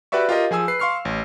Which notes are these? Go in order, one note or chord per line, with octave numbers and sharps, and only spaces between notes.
F#4 G4 B4 D5 E5 C#6
F4 G4 A#4 D#5
F3 G#4 G#5 E6
B4 C7
F5 C6 C#6 F6 C7
A1